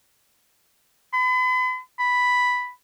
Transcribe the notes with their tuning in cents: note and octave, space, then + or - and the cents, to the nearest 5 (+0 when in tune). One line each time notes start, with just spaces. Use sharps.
B5 +40
B5 +0